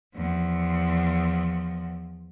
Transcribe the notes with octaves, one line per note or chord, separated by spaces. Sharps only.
E2 F3